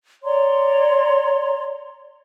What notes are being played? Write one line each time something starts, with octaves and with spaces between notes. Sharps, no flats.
C#5 D5 A#5 C6